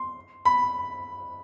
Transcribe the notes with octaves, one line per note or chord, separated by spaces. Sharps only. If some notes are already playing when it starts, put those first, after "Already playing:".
Already playing: C6
B5